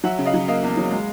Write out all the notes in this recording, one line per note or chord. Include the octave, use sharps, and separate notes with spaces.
F#3 E5 F#5
C#3
D#5 F5
F#3
A#3 D#5 F5
E2
F#3
G#3